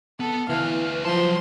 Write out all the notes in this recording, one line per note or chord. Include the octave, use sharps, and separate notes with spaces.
B3 A4
D2 E3 B4 F5
F3 F#3 A5 C6